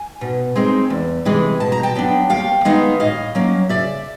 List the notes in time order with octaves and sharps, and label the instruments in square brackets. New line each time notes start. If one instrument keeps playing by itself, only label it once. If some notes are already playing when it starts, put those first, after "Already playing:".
Already playing: [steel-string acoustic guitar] G#5
B2
G#3 C4 D#4
E2
C3 E3 G#3
B2 A5
A#5
G5 A5
F#3 B3 D4
D#2 F5 G5
D#3 G#3 B3 D#4 D#5 F5
A2 D#5 F5
F#3 A#3 C#4
C#3 D5 E5